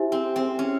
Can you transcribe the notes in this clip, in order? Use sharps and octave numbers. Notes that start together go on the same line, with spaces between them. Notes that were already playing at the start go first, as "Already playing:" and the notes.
Already playing: E4 G4 C5 E5 G#5
C4
C4
C#4